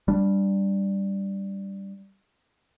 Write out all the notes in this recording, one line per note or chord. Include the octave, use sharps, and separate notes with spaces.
G3 D4